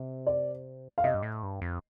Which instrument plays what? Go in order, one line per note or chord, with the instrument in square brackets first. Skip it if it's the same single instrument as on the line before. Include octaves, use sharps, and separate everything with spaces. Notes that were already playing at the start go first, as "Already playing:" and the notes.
Already playing: [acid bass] C3
[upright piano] D5
F5
[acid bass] C3 [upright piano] D#5
[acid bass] G2
A2
G2
F2